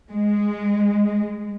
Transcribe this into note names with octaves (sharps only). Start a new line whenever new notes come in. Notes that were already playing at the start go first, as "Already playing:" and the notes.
G#3